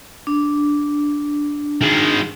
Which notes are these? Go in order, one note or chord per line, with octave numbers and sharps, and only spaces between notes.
D4
D#3 G#3